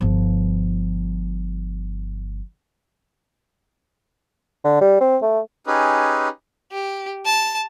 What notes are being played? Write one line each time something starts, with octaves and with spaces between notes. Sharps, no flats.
G1 F3
D3
G3
C4
A3
C#4 D#4 G4 G#4 B4
G4
A5